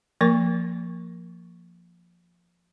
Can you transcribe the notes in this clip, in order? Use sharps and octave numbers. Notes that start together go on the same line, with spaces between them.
F3 A#3 A#4 C#6